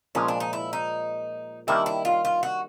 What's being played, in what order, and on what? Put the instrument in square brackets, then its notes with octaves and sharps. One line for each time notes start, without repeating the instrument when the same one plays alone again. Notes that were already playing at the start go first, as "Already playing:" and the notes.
[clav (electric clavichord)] A#2 F3 G#3 [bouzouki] C#4
[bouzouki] D4
D#4
E4
D#4
[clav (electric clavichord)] D#3 G3 A#3 D4 G4 [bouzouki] E4
[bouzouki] E4
F4
F4
F#4